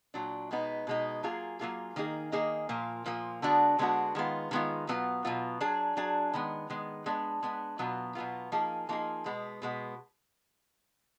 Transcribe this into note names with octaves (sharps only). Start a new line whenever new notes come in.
A#2 F#3 D4
B2 G#3 B3 D#4
B2 G#3 B3 D#4
F#3 A#3 F4 G#4
F#3 A#3 F4 G#4
D#3 A#3 D#4 G#4
D#3 A#3 D#4 G#4
A#2 F3 A#3
A#2 F3 A#3
D3 G#3 B3 D4 F#4
D3 G#3 B3 D4 F#4
D#3 G#3 B3 F4
D#3 G#3 B3 F4
B2 F#3 B3 F4
B2 F#3 B3 F4
F#3 D4 G#4
F#3 D4 G#4
D#3 G#3 B3
D#3 G#3 B3
G#3 B3 D4
G#3 B3 D4
B2 F#3 B3 F4
B2 F#3 B3 F4
F3 A#3 D#4 G#4
F3 A#3 D#4 G#4
B2 G#3 B3
B2 G#3 B3